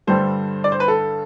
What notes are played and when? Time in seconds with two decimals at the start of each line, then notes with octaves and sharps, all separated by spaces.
0.07 G2 D3 G3 A4 C5
0.64 D5
0.72 C5
0.80 B4
0.88 A4